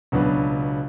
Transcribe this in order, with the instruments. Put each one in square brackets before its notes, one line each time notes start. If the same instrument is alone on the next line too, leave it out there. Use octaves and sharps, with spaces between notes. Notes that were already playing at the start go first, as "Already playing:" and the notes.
[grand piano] C#2 B2 F#3 B3 D4